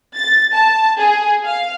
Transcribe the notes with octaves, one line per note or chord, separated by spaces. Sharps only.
A6
A5
G#4
F5